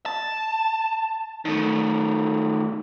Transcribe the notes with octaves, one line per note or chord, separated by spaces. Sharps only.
A5
D#3 A3